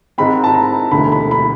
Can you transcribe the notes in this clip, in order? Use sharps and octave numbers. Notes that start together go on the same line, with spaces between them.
G#2 D#3 G#3 C4 B5
A5
A#5
E1 D2 D3 B5
B5
B5